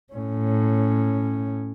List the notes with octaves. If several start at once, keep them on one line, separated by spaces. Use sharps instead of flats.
A2 C#4